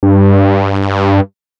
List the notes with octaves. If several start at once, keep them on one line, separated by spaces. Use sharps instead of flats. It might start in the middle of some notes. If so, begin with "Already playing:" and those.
G2